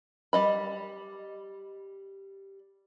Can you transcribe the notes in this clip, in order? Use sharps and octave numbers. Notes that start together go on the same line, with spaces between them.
G3 D#5 B5